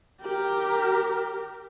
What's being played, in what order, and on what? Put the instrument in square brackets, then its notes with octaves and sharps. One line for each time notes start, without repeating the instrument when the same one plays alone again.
[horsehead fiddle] G4 A#4